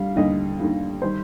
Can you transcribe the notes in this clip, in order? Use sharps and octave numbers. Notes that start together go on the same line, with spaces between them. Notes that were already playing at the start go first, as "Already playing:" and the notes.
Already playing: D3 G3 F5
D#2 D3 G3 D#5
D#2 D3 G3
D#3 G3 C5